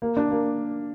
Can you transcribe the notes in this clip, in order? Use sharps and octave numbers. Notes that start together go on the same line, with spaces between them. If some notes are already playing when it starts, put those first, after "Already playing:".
A#3
D4
A#3